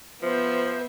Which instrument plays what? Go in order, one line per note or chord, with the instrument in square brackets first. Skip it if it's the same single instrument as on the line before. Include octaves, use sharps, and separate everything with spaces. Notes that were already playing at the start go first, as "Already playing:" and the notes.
[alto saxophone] F3 [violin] B3 E5 [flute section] C5